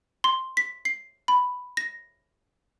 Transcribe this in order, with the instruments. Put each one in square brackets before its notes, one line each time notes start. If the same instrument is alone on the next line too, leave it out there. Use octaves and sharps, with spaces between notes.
[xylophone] C6
B6
C7
B5
A#6